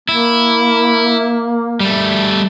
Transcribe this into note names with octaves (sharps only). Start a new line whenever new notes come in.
A#3 E4
G3 A3